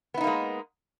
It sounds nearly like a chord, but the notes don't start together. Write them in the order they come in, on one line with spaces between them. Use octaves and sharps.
B3 E4 D#4 A#3 G#3